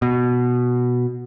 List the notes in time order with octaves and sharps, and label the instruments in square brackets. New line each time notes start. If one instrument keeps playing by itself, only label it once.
[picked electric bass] B2